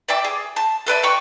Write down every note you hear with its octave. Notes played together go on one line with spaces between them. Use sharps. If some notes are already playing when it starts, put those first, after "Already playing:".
D5 E5 G5 D6
G#4
A5
A4 B4 D5 E5
D5 G5 C#6 E6